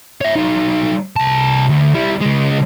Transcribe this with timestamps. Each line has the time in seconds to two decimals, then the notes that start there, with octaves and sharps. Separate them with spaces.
0.21 C#5 E5
0.36 F#3 D#4
1.16 C2 A5
1.69 D2
1.95 G3 E4
2.21 C#2 G#3